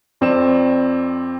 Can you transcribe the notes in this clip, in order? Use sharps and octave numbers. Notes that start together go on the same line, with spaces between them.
F2 C4 D5 E7